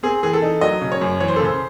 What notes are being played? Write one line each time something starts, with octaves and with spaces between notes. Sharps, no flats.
C4 G#4
E3 G#4
A4
D#4
F#3 D#5
C#3
C#5
F#2
E3 C#5
C5
A4
C#3 C5